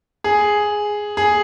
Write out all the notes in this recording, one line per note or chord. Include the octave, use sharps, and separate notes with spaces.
G#4
G#4